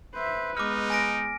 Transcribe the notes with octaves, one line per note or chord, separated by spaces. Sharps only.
B4 C5 E5
G#3 B3 D#4 D6 F6
G#5 A#6 D7